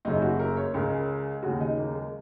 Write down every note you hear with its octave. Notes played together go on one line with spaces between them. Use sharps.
F#1 F#2 C#3 D#4
F#4
A#4
C#5
C#2 C#3 A#4
D#2 C#3 F#4
D#4
A#3
G#3